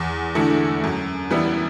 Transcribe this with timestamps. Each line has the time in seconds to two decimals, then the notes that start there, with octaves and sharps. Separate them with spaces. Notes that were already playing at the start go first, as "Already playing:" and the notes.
Already playing: E2
0.35 D3 A3 E4 A4
0.84 F#2
1.30 E3 G3 B3 E4